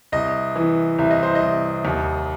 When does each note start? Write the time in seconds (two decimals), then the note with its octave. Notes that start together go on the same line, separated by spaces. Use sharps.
0.12 C2 D#5
0.55 E3
0.98 C2 E5
1.11 D#5
1.23 C5
1.35 D#5
1.41 C2
1.85 D#2